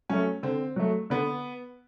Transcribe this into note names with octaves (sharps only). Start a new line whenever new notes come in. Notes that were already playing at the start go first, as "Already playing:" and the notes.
F#3 A3 C#4
D3 C4
F#3 A3
D3 B3